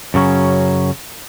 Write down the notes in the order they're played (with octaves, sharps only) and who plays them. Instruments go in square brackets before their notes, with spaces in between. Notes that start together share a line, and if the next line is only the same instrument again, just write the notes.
[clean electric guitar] F#2 C#3 F#3 C#4